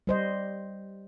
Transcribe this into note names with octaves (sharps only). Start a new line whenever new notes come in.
G3 C5 D#5